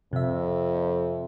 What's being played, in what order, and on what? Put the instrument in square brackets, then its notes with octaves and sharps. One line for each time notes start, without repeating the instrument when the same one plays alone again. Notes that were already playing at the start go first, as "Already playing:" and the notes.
[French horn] F2 [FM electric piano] C3 E5